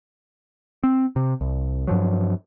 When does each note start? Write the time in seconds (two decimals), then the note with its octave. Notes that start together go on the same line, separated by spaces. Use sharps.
0.84 C4
1.16 C3
1.41 C2
1.87 G2 F3 F#3